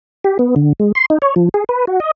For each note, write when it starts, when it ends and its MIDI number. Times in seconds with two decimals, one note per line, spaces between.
0.24 0.38 67
0.39 0.55 59
0.56 0.73 50
0.80 0.92 56
0.95 1.06 84
1.10 1.18 63
1.22 1.34 73
1.36 1.49 53
1.54 1.64 68
1.69 1.85 71
1.87 2.00 66
2.00 2.11 75